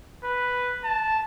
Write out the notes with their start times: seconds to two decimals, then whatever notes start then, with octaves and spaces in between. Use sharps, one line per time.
0.24 B4
0.84 A5